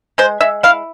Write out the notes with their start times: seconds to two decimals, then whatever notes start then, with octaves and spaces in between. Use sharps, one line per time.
0.18 G#3 C5
0.41 G#3 E5
0.63 E4 F5